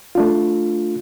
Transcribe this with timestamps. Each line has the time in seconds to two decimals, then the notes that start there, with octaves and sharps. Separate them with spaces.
0.15 A3 D4 F4